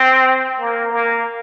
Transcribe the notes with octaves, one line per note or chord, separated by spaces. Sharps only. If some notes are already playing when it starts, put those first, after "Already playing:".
Already playing: C4
A#3
A#3